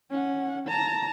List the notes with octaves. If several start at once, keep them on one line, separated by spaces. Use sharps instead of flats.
C#4 F#5
A5 A#5